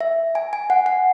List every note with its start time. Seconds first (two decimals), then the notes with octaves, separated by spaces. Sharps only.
0.01 E5
0.35 G#5
0.53 G#5
0.70 F#5
0.86 F#5